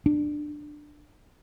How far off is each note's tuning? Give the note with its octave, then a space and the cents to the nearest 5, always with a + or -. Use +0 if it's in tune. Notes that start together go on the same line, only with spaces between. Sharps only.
D4 +15